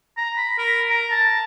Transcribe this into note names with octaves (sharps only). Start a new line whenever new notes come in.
A#5
B5
A#4
A#5
A5